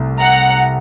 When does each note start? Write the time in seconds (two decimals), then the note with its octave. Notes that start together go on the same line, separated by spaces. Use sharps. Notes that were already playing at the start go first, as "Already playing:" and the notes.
Already playing: C2 C3 A3
0.20 F#5 A#5